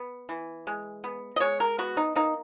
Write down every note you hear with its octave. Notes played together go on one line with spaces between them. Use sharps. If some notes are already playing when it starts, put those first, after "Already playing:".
Already playing: B3
E3
G#3
B3
D#5
G#3 C#5
A#4
B3 F#4
D#4
A#3 D#4